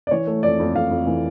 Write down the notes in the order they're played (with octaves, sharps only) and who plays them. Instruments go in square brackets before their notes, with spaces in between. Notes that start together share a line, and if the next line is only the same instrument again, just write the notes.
[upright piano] D5
E3 C#5
A3
F2 D5
F2
F2 F5
F2
E3